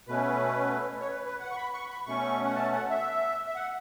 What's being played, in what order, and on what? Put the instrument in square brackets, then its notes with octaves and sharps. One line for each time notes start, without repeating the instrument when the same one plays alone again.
[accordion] B2 A3 C#4 B4
C#5
B4
B4
F#5
C#6
B5
C#6
B5
B2 A3 C#4 C#6
F#5
A5
F#5
E5
E5
F#5